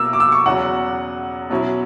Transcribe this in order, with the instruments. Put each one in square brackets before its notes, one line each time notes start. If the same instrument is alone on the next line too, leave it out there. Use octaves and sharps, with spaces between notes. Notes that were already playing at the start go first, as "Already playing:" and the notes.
Already playing: [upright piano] B2 A#3 D6 E6
D6
E6
C#6
E2 C#3 F#3 F#5
B2 F#3 C#4 E4